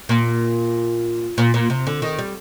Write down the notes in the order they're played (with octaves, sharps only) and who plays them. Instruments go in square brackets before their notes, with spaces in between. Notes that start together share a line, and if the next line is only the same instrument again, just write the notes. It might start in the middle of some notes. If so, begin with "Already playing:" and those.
[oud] A#2
A#2
A#2
C3
D3
D#3
G3